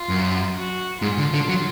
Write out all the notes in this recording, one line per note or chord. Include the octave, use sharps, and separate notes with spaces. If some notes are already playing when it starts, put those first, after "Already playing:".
Already playing: F4
F#2
F#4
G#2 F4
D3
D3
F#3